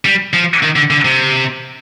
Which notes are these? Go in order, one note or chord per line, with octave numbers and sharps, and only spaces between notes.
G3
F3
D#3
D3
D3
C3